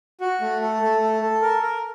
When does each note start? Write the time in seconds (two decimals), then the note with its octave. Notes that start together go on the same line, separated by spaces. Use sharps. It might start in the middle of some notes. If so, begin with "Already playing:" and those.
0.21 F#4
0.41 A3
0.62 A4
0.82 A3
1.01 A4
1.21 A4
1.42 A#4
1.63 A#4